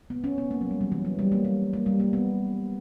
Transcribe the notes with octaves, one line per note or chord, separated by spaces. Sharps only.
B3
C#4
B3
A#3
F#3
G3
F#3
E3
F#3
G3
A#3
G3
A#3
G3
A#3
B3